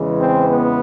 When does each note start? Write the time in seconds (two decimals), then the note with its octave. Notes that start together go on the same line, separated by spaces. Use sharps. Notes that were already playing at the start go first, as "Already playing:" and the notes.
Already playing: E2 C#3 E3 G#3
0.19 C4
0.49 B3